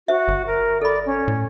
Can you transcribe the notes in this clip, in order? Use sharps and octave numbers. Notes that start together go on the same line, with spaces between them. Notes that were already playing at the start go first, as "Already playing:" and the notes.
F#4 C5 E5
G1
A#4
A4 D5 B5
C#4
A2